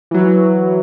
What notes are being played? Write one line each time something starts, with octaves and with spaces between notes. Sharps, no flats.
E3 F#3